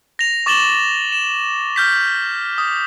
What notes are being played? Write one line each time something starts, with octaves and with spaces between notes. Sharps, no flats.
A#6 F7
C#6 D6 A6 E7 F#7 G7
E7
F6 G6 B6
D#6